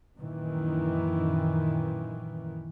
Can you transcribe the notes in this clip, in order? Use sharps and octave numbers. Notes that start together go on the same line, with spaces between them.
F#2 A#2 D#3 E3